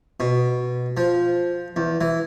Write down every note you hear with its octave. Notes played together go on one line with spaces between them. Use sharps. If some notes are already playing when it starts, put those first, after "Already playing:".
B2
F3
E2
E3